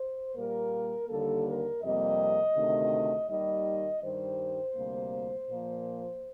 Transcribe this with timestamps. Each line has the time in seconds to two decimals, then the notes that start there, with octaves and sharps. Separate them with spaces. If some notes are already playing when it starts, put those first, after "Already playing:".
Already playing: C5
0.35 A#2 G3 A#3 A#4
1.09 D#2 D3 G3 A#3 A4
1.46 A#4
1.82 F2 C3 G3 A#3 D#5
2.56 D2 C3 D#3 A3
3.29 D#2 D#3 G3 D#5
4.02 G2 D#3 G3 C5
4.76 D2 C3 G3 A#3
5.49 A#2 F3 A#3